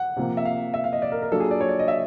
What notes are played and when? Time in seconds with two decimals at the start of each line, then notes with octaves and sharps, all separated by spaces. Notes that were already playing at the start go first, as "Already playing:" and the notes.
Already playing: F#5
0.17 C3 F3 A#3
0.37 E5
0.45 F5
0.74 E5
0.84 F5
0.93 D#5
1.02 D5
1.12 A#4
1.22 A#4
1.32 F#3 A#3 D4 F4 A4
1.40 G#4
1.51 D5
1.61 C#5
1.69 D5
1.79 D#5
1.88 E5